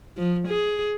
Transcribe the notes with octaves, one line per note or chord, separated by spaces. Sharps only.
F3
G#4